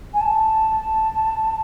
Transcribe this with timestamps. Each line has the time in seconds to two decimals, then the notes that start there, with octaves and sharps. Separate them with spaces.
0.14 G#5
0.21 A5